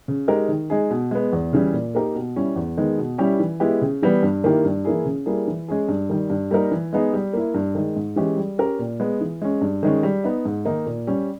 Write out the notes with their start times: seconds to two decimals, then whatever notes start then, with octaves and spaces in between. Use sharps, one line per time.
0.08 C#3
0.28 G#3 D#4 G4 A#4
0.48 D#3
0.70 G#3 D#4 G#4
0.91 B2
1.11 G#3 B3
1.33 E2
1.53 C#3 E3 G3
1.73 A#2
1.95 A#3 D#4 G4 A#4
2.15 B2
2.36 G3 C#4 E4
2.56 E2
2.77 D#3 G#3 B3
2.98 B2
3.18 G3 C#4 E4 G4
3.40 E3
3.60 G#3 B3 E4 G4
3.82 C#3
4.02 E3 G3 B3
4.23 G2
4.44 D#3 A#3 E4 G4
4.65 G2
4.85 E3 A#3 E4 G#4
5.05 C#3
5.26 G3 A#3 E4 G#4
5.48 E3
5.68 G#3 C#4 G#4
5.88 G2
6.10 D#3 G3
6.30 G2
6.51 G3 A#3 D#4 A#4
6.72 E3
6.93 G#3 B3 D#4 G#4
7.13 G3
7.33 A#3 E4
7.54 G2
7.75 D#3 G#3
7.96 G#2
8.16 E3 G#3 C#4 G4
8.37 G3
8.58 C#4 G4 A#4
8.79 A#2
9.00 G#3 B3
9.21 E3
9.42 G#3 C#4
9.61 G2
9.83 D#3 G#3 C#4
10.03 G3
10.24 B3 D#4
10.45 G#2
10.65 D#3 A#3 D#4
10.86 A#2
11.07 G3 C#4